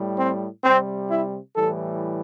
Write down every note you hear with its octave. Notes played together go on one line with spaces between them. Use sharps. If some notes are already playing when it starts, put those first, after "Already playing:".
Already playing: A2 G3
C4
C3 G3 C4
E4
A2 E3 G3 A4